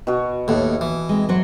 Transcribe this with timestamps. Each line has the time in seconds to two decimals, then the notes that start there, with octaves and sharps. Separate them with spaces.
0.07 B2 F#4
0.48 D#2 A2
0.81 E3
1.09 G#3 C4
1.29 F#3 F#4 C5